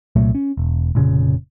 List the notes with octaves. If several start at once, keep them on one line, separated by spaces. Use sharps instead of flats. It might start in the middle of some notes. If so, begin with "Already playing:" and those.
C2 A#2 F#3 A3
C#4
E1
F1 A#2 C#3